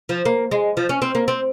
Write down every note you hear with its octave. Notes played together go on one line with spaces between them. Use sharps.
F3
A#3
G#3
F3
C#4
C4
A#3
C4